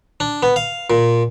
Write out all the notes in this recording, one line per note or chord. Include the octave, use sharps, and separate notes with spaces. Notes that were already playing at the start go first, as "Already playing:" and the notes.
D4
B3
F5
A#2